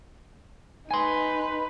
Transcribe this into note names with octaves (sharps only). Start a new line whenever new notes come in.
D#4 B4 G#5 C6